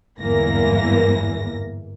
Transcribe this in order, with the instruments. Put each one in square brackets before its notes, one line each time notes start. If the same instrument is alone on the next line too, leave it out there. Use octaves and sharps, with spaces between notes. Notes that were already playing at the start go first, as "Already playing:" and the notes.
[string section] G1 E2 G#2 E3 A#3 A#6